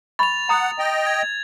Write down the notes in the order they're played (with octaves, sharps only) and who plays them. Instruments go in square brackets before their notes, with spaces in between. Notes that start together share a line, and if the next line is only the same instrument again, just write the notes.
[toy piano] B5 C#6 [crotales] A6 F7
[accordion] F#5 [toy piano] A#5 D#6
[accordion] D#5 G5
[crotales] G#6